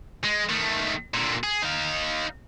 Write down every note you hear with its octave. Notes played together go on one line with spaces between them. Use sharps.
G#3
D#3 A3
A#2 D3
G#4
D#4 F5